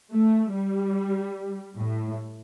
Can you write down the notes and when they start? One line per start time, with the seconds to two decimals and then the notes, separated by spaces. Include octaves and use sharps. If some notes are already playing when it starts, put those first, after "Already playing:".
0.13 A3
0.54 G3
1.76 A2